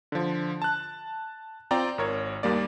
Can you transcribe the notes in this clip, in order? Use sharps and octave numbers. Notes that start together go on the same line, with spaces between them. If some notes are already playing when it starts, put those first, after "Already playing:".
D3 F3
A5 F#6
C4 F4 D5 G5 A#5
G#1 A#4 C#5
D#2 G3 A#3 D5